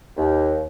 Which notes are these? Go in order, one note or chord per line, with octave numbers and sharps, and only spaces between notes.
D#2